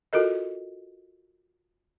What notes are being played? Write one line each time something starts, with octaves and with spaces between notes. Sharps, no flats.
F4 F#4 A4 A#4 D#5